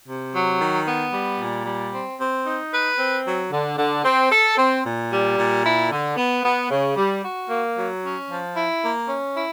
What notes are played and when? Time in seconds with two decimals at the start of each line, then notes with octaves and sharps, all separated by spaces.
0.07 C3
0.33 F#3
0.59 D#3
0.87 B3
1.13 G3
1.40 A#2
1.66 G3
1.92 C4
2.19 C4
2.45 D#4
2.72 B4
2.99 C4
3.26 F#3
3.52 D3
3.78 D3
4.04 C4
4.31 A4
4.57 C4
4.84 A#2
5.10 G3
5.38 A#2
5.64 E4
5.90 D3
6.17 B3
6.43 B3
6.70 C#3
6.96 G3
7.23 F#4
7.50 A#3
7.76 F#3
8.03 C#4
8.29 F3
8.55 E4
8.82 A#3
9.08 C#4
9.35 E4